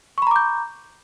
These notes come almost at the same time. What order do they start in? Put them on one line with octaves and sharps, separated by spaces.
C#6 B5 A#5 D6 G6